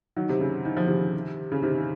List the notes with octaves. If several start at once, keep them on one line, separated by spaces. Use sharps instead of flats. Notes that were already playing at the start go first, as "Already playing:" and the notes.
D#3 F#3
C3
C#3
D#3
F3
C3 D#3
C#3
C3 D#3